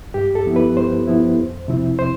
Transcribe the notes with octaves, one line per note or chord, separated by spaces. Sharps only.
G2 G4
A4
F3 B3 E4
B4
G2 C5
F3 B3 E4
F2
C3 F3 C4 E4
C5